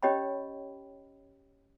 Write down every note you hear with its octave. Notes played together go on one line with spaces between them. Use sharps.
C#4 G4 C#5 D#5 G5 B5